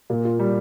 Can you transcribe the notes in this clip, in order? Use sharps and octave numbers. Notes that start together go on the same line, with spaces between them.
A#2
F4
G3